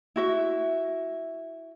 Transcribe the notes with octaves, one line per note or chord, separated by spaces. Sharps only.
E4 F#4 E5